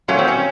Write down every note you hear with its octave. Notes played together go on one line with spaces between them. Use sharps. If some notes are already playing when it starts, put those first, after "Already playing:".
A#2 F#3 A3 C#4
C4
C#4